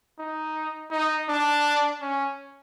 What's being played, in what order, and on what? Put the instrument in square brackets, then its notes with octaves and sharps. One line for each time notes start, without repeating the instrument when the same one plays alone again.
[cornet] D#4
D#4
D4
C#4